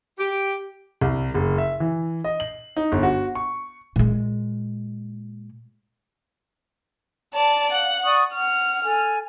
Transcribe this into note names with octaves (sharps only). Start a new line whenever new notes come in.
G4
C2
F#1
E5
E3
D#5
F#7
D#4
G1
F#4
C#6
A#2 G#3
D5 A5
F5 F#5
D5 C#6 D#6
F#5 F6
A4 G#5